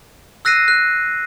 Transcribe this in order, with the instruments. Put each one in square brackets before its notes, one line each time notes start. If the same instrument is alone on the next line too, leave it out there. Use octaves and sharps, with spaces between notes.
[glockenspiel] E6 F#6 A#6 C7 D#7
F#6